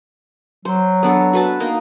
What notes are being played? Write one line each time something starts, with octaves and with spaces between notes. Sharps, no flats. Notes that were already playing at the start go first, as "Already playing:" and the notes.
F#3 C5
B3 D4 A4
F#4 B4 A5
A#3 D#4